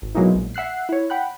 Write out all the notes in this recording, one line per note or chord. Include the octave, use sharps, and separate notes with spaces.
G#1
B2 F#3 G#3 A#3 D#4 E4
A#1
E5 F#5 E6 F#6 C7
E4 C#5
F#5 G5 B5 F#6